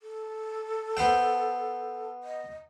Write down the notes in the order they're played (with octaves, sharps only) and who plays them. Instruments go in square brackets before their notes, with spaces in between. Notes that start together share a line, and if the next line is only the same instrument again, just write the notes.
[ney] A4
[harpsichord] B3 C5 G5
[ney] D#5